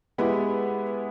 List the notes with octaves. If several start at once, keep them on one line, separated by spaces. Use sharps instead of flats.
G#3 B3 E4 G4